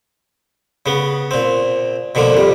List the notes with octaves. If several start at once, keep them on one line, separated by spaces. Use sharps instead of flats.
C#3 B3
A#2 C4
B2 D3 F3 A#3
F2 G3